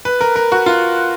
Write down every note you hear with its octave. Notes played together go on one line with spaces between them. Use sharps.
B4
A#4
A#4
F#4
F4